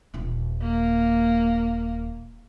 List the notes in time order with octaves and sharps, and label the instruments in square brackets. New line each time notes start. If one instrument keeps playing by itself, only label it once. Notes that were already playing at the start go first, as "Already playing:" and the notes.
[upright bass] D#1 F4
[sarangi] A#3